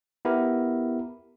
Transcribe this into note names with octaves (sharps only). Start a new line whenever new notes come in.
B3 E4 G4 A#4